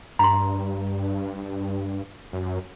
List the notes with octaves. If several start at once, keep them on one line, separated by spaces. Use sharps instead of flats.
G2 A#5 C6
F#2